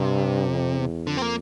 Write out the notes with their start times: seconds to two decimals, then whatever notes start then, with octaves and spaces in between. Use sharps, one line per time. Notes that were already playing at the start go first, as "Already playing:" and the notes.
Already playing: G2 C3
0.50 F2
0.78 E2
1.07 F2 D3
1.17 C4
1.22 A#3